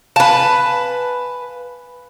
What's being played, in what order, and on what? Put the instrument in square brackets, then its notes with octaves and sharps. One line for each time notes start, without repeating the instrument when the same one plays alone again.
[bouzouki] B4 A5 [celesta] F5 G#5